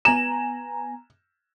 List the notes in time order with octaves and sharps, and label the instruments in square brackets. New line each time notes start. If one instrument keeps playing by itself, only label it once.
[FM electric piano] B3 G#5 A#5 [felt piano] E7